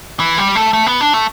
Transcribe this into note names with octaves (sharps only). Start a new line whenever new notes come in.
E3
G3
A3
A3
B3
D4
A3